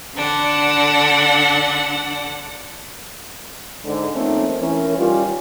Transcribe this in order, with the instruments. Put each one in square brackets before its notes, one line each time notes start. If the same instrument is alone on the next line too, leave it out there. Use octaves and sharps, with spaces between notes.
[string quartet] D3 D4 F#5
[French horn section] G#2 D3
F3 A3 A#3 C4 C#4 D#4
E3 C#4 A#4
D#3 G3 C#4 F4